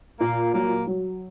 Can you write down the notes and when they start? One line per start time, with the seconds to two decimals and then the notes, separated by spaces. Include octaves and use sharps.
0.20 A#2 A#3
0.54 F#3 A#3
0.87 F#3